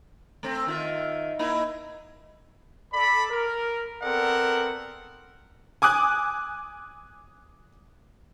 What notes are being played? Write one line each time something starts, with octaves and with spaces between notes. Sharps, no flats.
A3 C4
D#3 F4 E5
A#3 D#4 E4
A4 D5 B5
A#4
B3 C4 A4 A#4 D5 F#5
G#5 D6 D#6 F#6